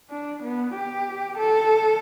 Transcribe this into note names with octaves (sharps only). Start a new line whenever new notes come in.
D4
B3
G4
A4